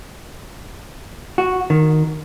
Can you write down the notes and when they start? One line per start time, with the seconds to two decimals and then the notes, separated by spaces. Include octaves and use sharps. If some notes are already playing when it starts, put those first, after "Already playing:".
1.38 F#4
1.70 D#3